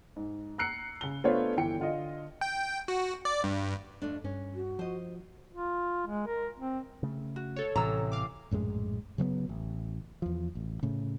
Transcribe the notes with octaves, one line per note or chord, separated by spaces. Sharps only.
G#2
A#5 E6 F#6 C7 C#7
C#3 G7
A3 B3 D4 F4 C5 C#5
G1 E3 G5 C#7
D3 F4 D#5
G5
F#4
D5
G2
F2 A3 D4
G2 C#4
F#4
F3 C5 D#5
F4
G#3
A#4
C4
C#3 A3
F#4
A4 C#5
A1 A2 C3 A#5 E6
F5 D6
A#1 F#2 A2 G#3
C#3 F#3 A3 B3
A1
E2 F3
A1
A2 C#3